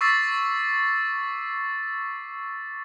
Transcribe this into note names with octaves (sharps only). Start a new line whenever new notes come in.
C#6 D6 E6 A6 B6 C7